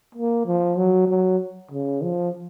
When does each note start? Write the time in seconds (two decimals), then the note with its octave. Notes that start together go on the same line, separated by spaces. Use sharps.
0.15 A#3
0.46 F3
0.77 F#3
1.08 F#3
1.71 C#3
2.02 F3